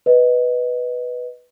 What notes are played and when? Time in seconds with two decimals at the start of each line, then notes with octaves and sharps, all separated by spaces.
0.06 B4 D#5